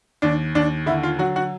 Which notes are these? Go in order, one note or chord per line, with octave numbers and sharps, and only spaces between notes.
D#2 D4
D#2 D4
D3 E4
F4
F#3 F#4
F#4